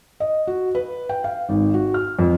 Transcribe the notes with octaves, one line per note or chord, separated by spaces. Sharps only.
D#5
F#4
B4
G5
F5
G#1
F#4
F6
F2